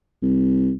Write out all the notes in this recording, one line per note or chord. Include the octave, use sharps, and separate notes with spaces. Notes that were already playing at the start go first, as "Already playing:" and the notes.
C2